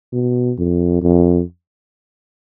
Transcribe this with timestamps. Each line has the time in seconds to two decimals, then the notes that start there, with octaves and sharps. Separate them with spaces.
0.13 B2
0.58 F2
1.02 F2